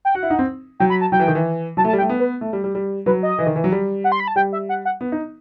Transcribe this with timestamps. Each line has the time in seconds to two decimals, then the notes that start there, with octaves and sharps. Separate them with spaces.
0.05 G5
0.15 F#4 F#5
0.23 E4
0.30 D#4
0.39 C4
0.80 F#3 G5
0.90 B5
1.01 A5
1.12 F#3 G5
1.19 E3
1.28 D#3
1.35 E3
1.77 F#3 A5
1.84 A3
1.88 A5
1.93 G3
1.98 G5
2.02 A3
2.09 B3
2.20 B4
2.41 A3
2.53 G3
2.64 G3
2.75 G3
3.06 F#3 B4
3.23 D#5
3.39 E3
3.47 D#3
3.56 E3
3.64 F#3
3.72 G3
4.04 F#5
4.12 C6
4.20 B5
4.28 A5
4.36 G3 G5
4.53 E5
4.69 F#5
4.85 F#5
5.01 B3
5.12 D#4